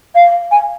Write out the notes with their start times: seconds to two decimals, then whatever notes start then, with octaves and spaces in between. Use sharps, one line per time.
0.15 F5
0.51 G#5